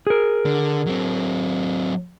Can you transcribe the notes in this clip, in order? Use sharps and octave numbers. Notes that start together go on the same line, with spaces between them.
G#4 A#4
D3
F#3 C4